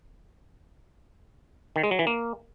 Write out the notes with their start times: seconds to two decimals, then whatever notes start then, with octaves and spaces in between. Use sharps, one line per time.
1.76 D#3
1.83 G#3
1.91 F#3
1.99 E3
2.07 A#3